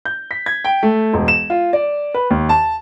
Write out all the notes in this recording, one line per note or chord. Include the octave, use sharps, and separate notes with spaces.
G6
B6
G#6
G5
A3
E1
E7
F4
D5
B4
D#2
A5